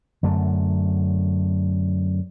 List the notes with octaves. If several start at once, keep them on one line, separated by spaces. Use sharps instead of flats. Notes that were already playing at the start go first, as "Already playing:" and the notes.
F#2 D3 A3